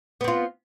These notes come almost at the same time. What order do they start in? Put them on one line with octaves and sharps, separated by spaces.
B3 C4 F4